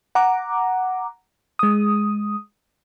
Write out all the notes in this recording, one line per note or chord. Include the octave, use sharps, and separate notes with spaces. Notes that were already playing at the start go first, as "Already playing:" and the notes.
F#5 A#5 D6
G#3 D#6